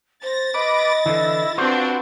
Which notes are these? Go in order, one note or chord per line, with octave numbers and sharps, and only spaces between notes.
C5 A6 A#6
B4 D#5 D6
D3 E3 E4
C4 D4 F4 F#4 B4 C5